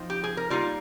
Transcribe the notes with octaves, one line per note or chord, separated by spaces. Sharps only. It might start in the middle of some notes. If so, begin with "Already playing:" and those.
Already playing: F3 C4 D#4
G4
G#4
A#4
G3 A#3 D#4 F4